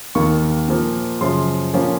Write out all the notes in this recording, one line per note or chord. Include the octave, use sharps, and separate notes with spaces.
D#2 D#3 A#3 C#6
A#2 F3 A#3
F#2 C#3 F3 C6
A#2 F3 A#3 C#4